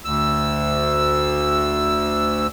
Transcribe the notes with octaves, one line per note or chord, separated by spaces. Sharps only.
D2 E6